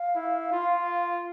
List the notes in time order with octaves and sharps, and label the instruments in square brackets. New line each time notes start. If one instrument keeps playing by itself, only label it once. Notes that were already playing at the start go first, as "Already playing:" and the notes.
Already playing: [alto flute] F5
[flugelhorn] E4
F4